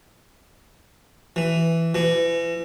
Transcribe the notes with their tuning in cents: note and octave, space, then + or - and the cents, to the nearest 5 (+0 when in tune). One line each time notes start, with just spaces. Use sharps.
E3 +5
E3 +35